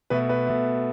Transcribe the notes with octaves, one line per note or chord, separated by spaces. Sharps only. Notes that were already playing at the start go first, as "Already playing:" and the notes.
B2 A3 B4
B4
B2 A3